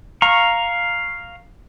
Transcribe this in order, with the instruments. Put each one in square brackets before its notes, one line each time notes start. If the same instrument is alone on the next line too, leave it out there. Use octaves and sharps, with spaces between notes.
[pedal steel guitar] F5 A#5 C#6